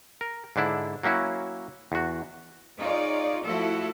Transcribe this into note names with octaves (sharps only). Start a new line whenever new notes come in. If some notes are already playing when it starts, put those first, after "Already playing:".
A#4
G#2 D3 D4 E4
F#3 A#3 C#4 E4 F#4
E2 F#4
D#4 F4 G#4 C#5 D5
F3 A3 E4 F#4 A4